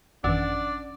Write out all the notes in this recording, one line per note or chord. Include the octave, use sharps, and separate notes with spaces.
G#1 F#2 E3 C#4 D4 D5